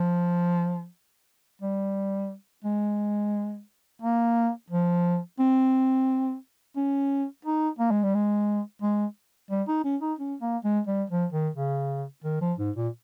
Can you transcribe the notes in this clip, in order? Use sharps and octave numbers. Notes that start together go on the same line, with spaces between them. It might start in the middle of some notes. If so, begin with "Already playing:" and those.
Already playing: F3
G3
G#3
A#3
F3
C4
C#4
D#4
A#3
G#3
G3
G#3
G#3
G3
D#4
C#4
D#4
C#4
A#3
G#3
G3
F3
D#3
C#3
D#3
F3
G#2
A#2